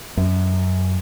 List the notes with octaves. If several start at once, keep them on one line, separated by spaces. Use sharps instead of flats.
F#2